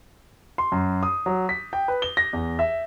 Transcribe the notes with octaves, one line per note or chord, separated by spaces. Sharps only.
C6
F#2
D#6
F#3
B6
G5
B4
G7
A#6
E2
E5